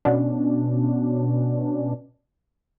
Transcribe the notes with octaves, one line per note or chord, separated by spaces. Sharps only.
B2 C#4 D4